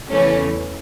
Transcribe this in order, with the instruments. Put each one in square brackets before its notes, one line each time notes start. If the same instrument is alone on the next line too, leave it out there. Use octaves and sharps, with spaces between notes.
[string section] E2 C#3 E3 A3 C#4